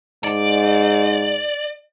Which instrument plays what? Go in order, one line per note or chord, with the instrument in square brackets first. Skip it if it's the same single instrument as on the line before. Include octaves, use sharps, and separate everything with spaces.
[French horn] G#2 [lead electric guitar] D5